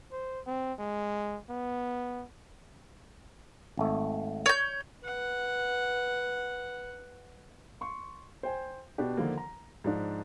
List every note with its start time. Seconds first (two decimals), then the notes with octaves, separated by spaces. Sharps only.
0.12 C5
0.46 C4
0.79 G#3
1.49 B3
3.77 G#1 A3
4.46 C#5 G6
5.02 B4 F#5
7.81 C6 C#6
8.43 C5 G5 G#5
8.98 B2 D4 G4
9.17 D3 D#3 F3 A#3
9.37 A#5
9.84 G#2 F3 D4